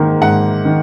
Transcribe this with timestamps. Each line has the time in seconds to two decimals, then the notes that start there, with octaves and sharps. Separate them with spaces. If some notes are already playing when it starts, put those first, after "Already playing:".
Already playing: G#2 D#3 A#3
0.21 G#2 F#5
0.65 D#3